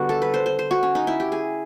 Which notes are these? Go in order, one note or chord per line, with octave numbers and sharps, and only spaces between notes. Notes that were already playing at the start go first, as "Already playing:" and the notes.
Already playing: D3 G3 B3 F#4
A4
B4
C5
C5
C5
F#4
C#4
D#4
E4
G4
G#4